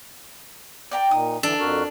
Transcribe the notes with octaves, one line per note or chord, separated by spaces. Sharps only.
D5 G5 A#5
A#2 D#4 D#6
D3 E3 D4 A4
F2 F#4 A#4